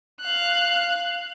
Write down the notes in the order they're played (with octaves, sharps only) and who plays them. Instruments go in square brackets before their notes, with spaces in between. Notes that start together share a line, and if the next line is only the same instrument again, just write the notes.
[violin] F5 F#6